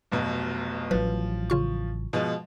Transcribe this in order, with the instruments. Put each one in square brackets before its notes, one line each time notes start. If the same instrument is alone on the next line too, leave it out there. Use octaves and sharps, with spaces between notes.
[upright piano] F1 B1 B2
[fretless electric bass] A1 F#3 [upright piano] F3 [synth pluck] B4
[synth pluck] C#3 F4 C#6
[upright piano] B2 F3 G#3